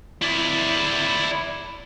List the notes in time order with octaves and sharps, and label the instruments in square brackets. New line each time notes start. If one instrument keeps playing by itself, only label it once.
[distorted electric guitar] E4 D5